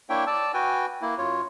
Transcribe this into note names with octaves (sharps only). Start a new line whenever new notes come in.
A#3 D4 E4 C#5 E5 G5
D5 A5 E6
F#4 B4 G5 G#5
A#3 E4
F#2 F4 C#5